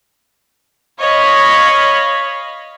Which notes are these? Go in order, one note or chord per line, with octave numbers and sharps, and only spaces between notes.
C#5 D#5 F5 B5